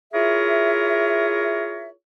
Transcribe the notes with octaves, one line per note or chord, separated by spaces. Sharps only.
E4 F4 G#4 A#4 C#5 E5